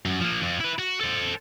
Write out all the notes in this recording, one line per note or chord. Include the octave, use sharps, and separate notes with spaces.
F#2
F3 A#3
F2
E4 B4
F#4
A4 C5